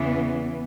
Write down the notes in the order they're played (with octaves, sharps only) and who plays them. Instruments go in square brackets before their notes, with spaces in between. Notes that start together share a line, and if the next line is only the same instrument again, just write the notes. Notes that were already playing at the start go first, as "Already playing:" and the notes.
Already playing: [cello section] E2 C#3 E3 B3